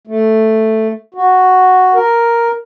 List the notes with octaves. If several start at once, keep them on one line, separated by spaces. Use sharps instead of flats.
A3
F#4
A#4